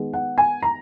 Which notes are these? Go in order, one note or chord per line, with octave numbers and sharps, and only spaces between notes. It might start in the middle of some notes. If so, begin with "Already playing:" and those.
Already playing: D#3 G#3 B3
F#5
G#5
A#5